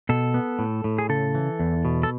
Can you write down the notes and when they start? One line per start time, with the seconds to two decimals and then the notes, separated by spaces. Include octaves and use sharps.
0.09 B2 A4
0.34 B3
0.59 A2
0.84 A2
0.98 G#4
1.09 C#3 A4
1.35 E3
1.59 E2
1.85 B2
2.03 A4